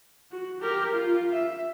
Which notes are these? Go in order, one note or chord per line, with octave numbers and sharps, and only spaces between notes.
F#4
G4 A#4
F4
E5